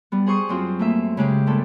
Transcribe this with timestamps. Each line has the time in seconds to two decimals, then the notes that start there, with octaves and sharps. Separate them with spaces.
0.12 G3 B3
0.26 G#4 C5 C#6 D#6
0.49 F#2 C4 F4
0.79 A3 A#3 E5
1.17 C#3 G#3 G4
1.47 G2 A#2 A4